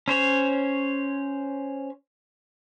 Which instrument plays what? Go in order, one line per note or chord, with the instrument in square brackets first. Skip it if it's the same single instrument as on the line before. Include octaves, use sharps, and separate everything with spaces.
[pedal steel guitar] C#4 C5 C#5